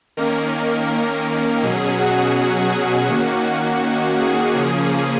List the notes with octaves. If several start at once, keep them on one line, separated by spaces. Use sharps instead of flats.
D#3 A#3 C#4 A#4
B2 F#3 C#4 G#4
F#4
D#3 A#3 C#4
F#4
G#4
C#3 F3 A#3 C#4